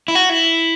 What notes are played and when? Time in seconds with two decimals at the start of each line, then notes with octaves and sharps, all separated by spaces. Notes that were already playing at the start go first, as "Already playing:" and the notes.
0.08 E4
0.15 F#4
0.30 E4